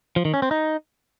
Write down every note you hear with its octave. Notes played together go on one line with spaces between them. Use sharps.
F3
D#3
C#4
C4
D#4